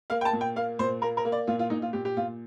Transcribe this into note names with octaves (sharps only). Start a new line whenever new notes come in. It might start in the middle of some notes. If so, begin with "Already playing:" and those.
A#3 F5
G5
A5
A#2
G5
A#3 F5
A#2 C5
A#3 A#4
A#4
A#3
D5
A#2 F4
F4
A#2 D#4
F4
A#2 G4
G4
A#2 F4